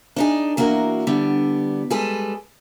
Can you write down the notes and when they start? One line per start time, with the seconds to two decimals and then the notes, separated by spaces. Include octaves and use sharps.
0.16 D4 D#4 G#4
0.57 E3 A#3 D4 F#4 A#4
1.07 D3 G3 B3 D4
1.90 G3 G#3 G#4 A4 B4